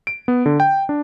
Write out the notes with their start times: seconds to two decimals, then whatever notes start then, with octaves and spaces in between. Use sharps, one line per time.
0.07 D7
0.28 B3
0.46 D3
0.60 G5
0.89 D4